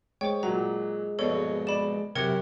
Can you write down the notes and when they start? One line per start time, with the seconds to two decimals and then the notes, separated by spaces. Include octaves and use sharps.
0.21 G#3 C5 C#5 G5
0.43 A#2 F#3 A#5
1.19 A#1 G2 B2 A4 C#5
1.67 D5 B5 E7
2.15 F#2 C3 E4 F#4 G4 A#4 G#6 C#7